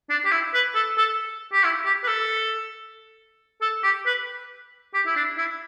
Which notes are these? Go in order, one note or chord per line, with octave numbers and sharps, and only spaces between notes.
D4
G4
E4
B4
A4
A4
G4
E4
G4
B4
A4
A4
G4
B4
G4
E4
D4
E4